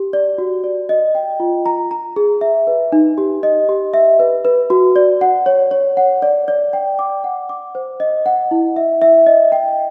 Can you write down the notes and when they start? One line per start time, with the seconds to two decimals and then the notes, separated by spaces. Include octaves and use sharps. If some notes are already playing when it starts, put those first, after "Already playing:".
Already playing: G4
0.13 D5
0.38 F#4
0.64 D5
0.89 D#5
1.15 G5
1.40 F4
1.66 A#5
1.91 A#5
2.16 G#4
2.41 E5
2.67 B4
2.92 D#4
3.18 G4
3.43 D#5
3.69 G4
3.94 E5
4.19 B4
4.45 B4
4.70 F#4
4.96 D5
5.21 F#5
5.46 C#5
5.71 C#5
5.97 F#5
6.22 D5
6.48 D5
6.73 G5
6.99 D6
7.24 F#5
7.49 D6
7.75 C5
8.00 D#5
8.26 F#5
8.51 E4
8.76 E5
9.02 E5
9.27 D#5
9.52 G5